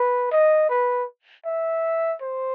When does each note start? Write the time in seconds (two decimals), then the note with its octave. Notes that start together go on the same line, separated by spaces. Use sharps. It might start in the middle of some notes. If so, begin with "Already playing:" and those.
Already playing: B4
0.31 D#5
0.70 B4
1.46 E5
2.22 C5